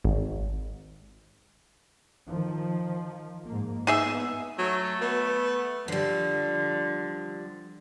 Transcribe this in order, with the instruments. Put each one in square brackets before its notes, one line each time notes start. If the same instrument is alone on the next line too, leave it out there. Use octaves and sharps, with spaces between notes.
[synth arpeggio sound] G#1
[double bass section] D#3 F3
G#2 A#3
[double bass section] B3 [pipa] D#4 G#4 E5
[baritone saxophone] F#3 [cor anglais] A3
[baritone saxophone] B3
[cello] D3 [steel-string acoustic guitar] F3 G3